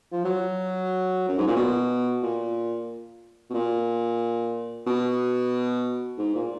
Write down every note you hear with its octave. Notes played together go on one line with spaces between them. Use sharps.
F3
F#3
F#2
G#2
A#2
B2
A#2
B2
A#2
B2
G#2
A#2